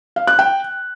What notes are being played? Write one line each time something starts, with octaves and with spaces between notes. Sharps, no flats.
F5
F#6
G5